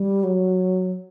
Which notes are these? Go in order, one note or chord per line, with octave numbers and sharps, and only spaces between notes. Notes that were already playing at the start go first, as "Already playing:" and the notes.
Already playing: G3
F#3